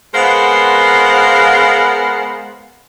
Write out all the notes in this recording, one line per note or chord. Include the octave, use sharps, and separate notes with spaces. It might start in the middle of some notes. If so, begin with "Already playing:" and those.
G#3 B3 A#4 C5 F5 F#5